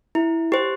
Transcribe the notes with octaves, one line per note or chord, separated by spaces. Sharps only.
E4
G4 C5